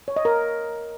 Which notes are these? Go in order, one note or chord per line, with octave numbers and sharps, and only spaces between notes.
C#5
D#5
A#4